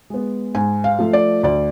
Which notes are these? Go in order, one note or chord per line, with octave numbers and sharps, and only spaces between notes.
G#3 B3
G#2 G#5
F5
F3 A3
D5
D2 D5